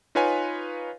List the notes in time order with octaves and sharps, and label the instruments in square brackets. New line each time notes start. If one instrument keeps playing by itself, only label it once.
[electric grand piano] D#4 F4 B4 C#5 F5 G#5